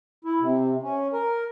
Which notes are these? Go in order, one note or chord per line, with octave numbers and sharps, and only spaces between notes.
E4
C3
C#4
A#4